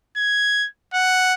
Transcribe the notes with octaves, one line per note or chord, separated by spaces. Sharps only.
G#6
F#5